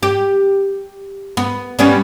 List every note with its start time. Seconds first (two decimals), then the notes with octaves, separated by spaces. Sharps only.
0.03 G4
1.37 B3
1.79 G3 B3 C#4